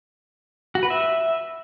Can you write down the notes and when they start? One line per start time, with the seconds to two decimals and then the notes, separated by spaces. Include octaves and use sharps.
0.75 F#4
0.83 B4
0.90 E5